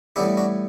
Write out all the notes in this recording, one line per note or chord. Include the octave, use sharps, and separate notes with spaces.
A2 E3 G3 B3 D4 E4 G4
D4 F#4